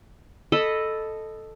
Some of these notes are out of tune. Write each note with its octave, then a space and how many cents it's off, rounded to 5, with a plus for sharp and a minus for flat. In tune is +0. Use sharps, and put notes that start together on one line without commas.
A4 +0 D#5 -10 B5 +0